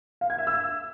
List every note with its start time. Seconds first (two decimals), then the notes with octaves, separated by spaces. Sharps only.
0.21 F5
0.30 G#6
0.38 E5
0.47 E6